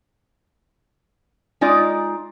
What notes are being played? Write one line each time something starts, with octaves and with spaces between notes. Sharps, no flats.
G#3 D#4 F4 D5